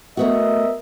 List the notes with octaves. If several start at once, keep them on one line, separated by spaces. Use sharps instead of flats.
A3 B3 F#4 A#4 D#5 E5